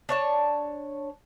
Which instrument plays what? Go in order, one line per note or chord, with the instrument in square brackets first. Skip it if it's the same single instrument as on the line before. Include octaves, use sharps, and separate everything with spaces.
[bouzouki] D4 C#5 A5